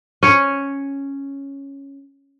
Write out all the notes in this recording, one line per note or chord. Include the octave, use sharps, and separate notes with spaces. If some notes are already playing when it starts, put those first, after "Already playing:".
C#4 C#5